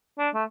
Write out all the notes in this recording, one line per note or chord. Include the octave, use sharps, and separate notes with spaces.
D4
A3